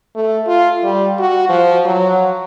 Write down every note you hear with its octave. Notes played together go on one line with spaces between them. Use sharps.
A3
F4
G3
F#4
F3
F#3